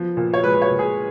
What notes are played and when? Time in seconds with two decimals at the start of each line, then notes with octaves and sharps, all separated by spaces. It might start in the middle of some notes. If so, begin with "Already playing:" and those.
Already playing: F3 B3
0.17 A#2
0.34 C#5
0.44 G#3 B4
0.54 B4
0.62 C#5
0.71 A#2
0.79 G#4